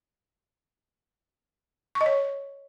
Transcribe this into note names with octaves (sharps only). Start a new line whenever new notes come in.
C#6
D#5
C#5